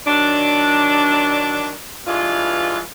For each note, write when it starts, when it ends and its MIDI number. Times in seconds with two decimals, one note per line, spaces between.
0.06 1.71 51
0.06 1.71 54
0.06 1.71 62
2.07 2.79 43
2.07 2.79 52
2.07 2.79 56
2.07 2.79 65